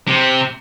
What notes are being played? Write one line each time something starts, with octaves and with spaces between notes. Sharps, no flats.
C3